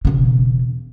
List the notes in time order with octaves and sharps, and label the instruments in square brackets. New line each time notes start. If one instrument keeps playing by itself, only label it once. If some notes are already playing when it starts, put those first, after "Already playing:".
[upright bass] E1 C#3